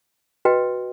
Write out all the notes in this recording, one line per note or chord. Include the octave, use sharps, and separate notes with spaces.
F#4 B4 D#5 G5